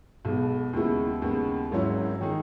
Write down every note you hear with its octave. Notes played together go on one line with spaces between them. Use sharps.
B1 B2 G#3 B3
D#2 C#3 G#3 B3 E4
D#2 C#3 G#3 B3
G#1 G#2 F#3 C#4 E4
D#3 G#3 D#4 G#4